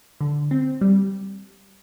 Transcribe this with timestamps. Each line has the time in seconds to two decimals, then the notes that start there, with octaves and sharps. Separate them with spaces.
0.21 D3
0.51 C4
0.81 G3